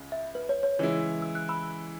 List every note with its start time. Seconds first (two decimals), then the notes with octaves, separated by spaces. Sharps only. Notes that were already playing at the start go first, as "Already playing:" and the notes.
Already playing: C#2 C#3
0.12 E5
0.35 B4
0.49 C#5
0.63 C#5
0.79 C#3 E3 G#3 E4
1.22 E6
1.35 F#6
1.49 B5 E6